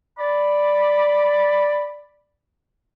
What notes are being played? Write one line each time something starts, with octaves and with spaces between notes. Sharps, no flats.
D5 B5